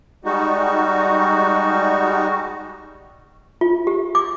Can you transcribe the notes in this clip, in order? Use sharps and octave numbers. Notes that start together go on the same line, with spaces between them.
G3 G#3 D#4 F#4
F4
G4
D6